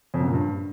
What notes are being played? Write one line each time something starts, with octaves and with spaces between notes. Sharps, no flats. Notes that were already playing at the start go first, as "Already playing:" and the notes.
F2
F#2
A#2
G2